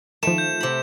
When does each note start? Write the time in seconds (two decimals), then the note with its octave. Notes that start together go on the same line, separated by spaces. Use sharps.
0.23 D#3 F3 A3 E7
0.38 G6
0.60 C3 B5